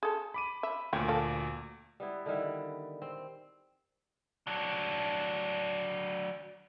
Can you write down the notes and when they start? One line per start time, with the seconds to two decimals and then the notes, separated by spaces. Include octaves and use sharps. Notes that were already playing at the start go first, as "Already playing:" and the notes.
0.03 G#4 A4
0.34 B5 D6 D#7
0.63 E5
0.93 D2 A#2 C#5 G5
1.08 A4 F5
2.00 G3 B3 E4
2.26 D3 D#3 G3 E4
3.02 C4
4.47 F#3 D4